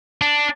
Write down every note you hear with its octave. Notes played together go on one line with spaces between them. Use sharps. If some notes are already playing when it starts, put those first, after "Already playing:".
D4